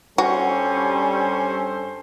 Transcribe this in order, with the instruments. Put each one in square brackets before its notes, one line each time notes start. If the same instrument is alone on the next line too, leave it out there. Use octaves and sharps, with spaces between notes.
[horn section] G2 A4 C5 [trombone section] G3 [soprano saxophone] C#4 [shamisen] F#4